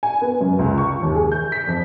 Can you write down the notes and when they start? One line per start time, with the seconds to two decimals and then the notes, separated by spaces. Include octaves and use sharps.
0.03 G#5
0.21 B3
0.41 F#2
0.59 C#2
0.78 C#6
1.02 D#2
1.15 G#4
1.32 G6
1.52 B6
1.67 F2